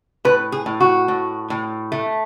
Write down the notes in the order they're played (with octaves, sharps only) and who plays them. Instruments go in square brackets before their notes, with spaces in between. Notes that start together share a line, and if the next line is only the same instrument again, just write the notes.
[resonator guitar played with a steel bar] A2 B4
G#4
A2
F#4
A2
A2
A3